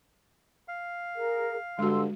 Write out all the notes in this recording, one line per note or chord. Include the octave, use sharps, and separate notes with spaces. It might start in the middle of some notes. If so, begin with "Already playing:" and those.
F5
G#4 A#4
G2 D3 G#3 F#4 C6 E6